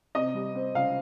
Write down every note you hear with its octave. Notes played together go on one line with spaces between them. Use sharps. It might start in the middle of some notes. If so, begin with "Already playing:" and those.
C3 D#5
G3
C4
C#2 F5